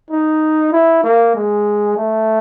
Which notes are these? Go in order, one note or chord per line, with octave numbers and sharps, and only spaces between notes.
D#4
E4
A#3
G#3
A3